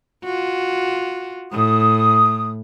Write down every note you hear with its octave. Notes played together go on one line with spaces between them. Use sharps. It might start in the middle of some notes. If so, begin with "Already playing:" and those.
F4 F#4
A2 D#6